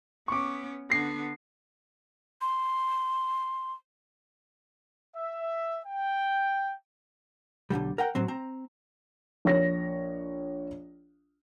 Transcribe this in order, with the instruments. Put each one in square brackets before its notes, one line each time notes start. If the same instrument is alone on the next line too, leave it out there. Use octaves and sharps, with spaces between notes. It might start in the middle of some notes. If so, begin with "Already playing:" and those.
[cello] B3 C#4 [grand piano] C#6 D6
[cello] D3 B3 [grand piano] A#6 C7
[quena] C6
[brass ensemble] E5
G5
[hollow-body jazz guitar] B1 E2 D3 G3
A#4 F#5 G5
A2 F#3 C4
C4 A#5
[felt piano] A#1 C#5 A#6